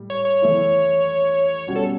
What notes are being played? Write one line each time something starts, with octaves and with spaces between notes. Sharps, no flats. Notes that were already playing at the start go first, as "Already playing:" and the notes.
Already playing: A2 G3
C#5
C#5
E3 A3 E4
B2 G3 C#4 F#4
A4